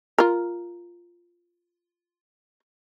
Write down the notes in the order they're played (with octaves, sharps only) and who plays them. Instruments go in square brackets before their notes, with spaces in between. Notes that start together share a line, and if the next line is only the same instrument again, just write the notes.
[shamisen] F4 A#4